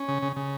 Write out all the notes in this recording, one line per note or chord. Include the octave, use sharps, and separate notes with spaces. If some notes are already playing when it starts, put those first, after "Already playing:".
Already playing: C#4
C#3
C#3
C#3